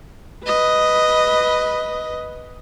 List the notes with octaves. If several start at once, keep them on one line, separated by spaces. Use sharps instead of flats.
B4 D#5